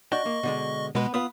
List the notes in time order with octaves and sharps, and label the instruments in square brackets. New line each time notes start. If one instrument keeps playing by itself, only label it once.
[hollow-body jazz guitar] D4 F#4 G5 [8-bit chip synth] D#5 C#6
[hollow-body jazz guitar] A#3
B2 D3 G#3
[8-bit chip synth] B2 G#3 [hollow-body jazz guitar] B3 B4
[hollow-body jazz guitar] B3 F4 B4 [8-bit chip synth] D#6